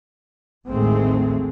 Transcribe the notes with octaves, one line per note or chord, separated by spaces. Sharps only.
A1 D#2 A2 G#3 A3 C4